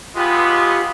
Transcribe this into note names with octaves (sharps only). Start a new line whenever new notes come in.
C#2 G#3 B3 F4 G4